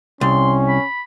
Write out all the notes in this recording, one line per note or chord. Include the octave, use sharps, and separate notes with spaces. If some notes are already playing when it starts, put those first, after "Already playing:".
C2 C#4 C6
B5